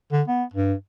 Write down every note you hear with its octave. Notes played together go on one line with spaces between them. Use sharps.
D3
B3
G2